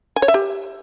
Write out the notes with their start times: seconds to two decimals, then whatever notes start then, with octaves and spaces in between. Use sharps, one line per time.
0.16 G#5
0.22 C#5
0.28 E5
0.34 G4